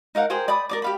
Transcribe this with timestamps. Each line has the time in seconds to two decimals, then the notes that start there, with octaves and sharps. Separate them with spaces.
0.15 D#4 A#4 F5 F#5
0.30 G#4 A#4 C5 G5
0.48 D5 B5 D6 D#6
0.69 A#4 D5 D6
0.82 G4 F5 B5